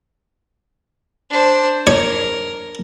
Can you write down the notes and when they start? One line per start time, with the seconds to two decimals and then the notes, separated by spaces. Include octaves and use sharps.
1.30 D4 C5
1.87 A#4 C#5